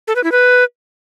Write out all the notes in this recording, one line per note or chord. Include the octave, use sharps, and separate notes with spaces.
A4
B4
E4
B4